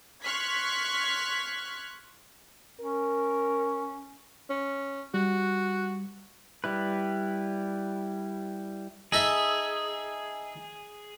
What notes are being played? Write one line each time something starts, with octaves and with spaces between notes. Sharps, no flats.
C6 C#6 F6 F#6 G#6 B6
C#4 A#4
C#4
G3 F#4
G3 E4 B4
D#4 G#4 A4 E5